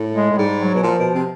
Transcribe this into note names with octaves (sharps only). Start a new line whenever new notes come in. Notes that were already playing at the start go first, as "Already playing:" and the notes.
Already playing: A2
G#3
A2
G#2 G3
F#3
B2
A#2 F3
B2
C3